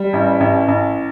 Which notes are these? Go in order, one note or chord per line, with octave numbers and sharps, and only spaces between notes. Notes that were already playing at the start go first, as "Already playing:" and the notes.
Already playing: G3
A1
A1
A1